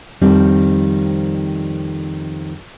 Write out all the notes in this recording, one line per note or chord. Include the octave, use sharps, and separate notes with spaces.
F2 D#3 G3 C4